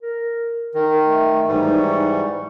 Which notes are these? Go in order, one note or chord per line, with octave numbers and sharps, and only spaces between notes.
A#4
D#3 A#4
A3
G#2 E3 G3 D#4
C#6